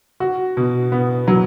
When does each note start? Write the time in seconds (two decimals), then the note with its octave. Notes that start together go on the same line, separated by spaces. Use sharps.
0.20 F#4
0.57 B2
0.92 B3
1.28 F#3